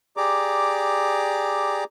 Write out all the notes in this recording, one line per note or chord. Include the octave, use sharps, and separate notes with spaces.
G4 G#4 D5 A#5 D6